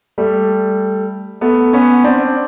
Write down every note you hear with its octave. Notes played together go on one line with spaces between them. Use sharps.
G3 A3
A3 B3
B3 C#4
C4 D4